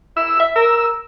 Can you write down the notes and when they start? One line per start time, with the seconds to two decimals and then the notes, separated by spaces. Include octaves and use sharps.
0.17 E4 E6
0.40 E5
0.56 A#4 E6